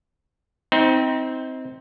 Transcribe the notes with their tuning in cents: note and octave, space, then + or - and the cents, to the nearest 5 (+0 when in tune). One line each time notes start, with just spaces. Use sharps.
C4 -5 D#4 +30